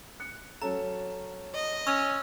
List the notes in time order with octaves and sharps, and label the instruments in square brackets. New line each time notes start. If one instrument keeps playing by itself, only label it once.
[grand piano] F#6 C#7
[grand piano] F#3 C#4 A4 [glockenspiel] A#5
[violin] D#5
[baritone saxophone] C#4 [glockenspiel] C#6 E6